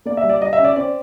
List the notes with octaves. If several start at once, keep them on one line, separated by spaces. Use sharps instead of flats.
A#3 D5
E5
G3
D5
G3 D#5
E5
C#4
D5
C4 D5